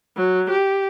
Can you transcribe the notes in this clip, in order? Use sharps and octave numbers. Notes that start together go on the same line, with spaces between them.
F#3
G4